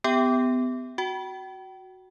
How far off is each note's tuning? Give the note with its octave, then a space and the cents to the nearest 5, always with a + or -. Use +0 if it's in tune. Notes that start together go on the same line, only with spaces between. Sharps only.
B3 +30 G4 +20 G5 +0
F#4 +0 G5 -35